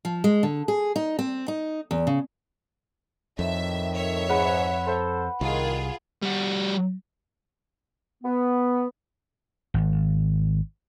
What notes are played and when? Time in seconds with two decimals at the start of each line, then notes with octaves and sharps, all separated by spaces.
0.05 F3
0.24 G#3
0.43 D3
0.68 G#4
0.96 D#4
1.19 C4
1.48 D#4
1.91 E2
2.07 C#3
3.39 F2 A2 D#3 E5
3.95 C#5 E5
4.29 G#2 B4 F#5
4.87 A4 C5
5.41 C2 D#3 F4 G#4
6.22 G3 F#4
8.23 B3
9.74 G#1